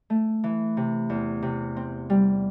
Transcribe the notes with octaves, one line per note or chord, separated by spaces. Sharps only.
A3
E3
C3
E2
C3
C4
G3